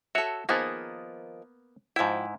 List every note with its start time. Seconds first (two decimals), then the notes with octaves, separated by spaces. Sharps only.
0.15 F#4 A4 C#5 E5
0.49 D#3 F3 A#3 B3 G#4
1.96 G#2 F3 E4 G5